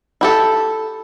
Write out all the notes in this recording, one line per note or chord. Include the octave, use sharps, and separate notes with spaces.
E4 G4 A4